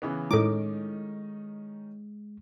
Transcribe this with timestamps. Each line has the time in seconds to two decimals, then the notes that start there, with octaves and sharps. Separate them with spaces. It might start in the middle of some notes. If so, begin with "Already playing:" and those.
0.02 C#3 E3 B3
0.31 A2 D#3 G#3 C#4 D#4 E4 A4 D6